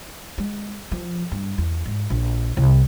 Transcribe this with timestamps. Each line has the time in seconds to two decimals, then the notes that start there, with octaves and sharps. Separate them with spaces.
0.38 G#3
0.91 F3
1.32 G2
1.58 E2
1.86 G#2
2.10 A#1
2.57 C2